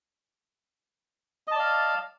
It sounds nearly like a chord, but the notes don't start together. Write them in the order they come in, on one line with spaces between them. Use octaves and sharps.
D#5 A5 D5 F5